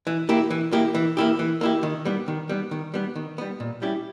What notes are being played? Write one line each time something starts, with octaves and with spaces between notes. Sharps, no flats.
E3
A#3 E4 G4
E3
A#3 E4 G4
E3
A#3 E4 G4
E3
A#3 E4 G4
D#3
G3 B3
D#3
G3 B3
D#3
G3 B3
D#3
G3 B3
A#2
G3 C#4 E4 G4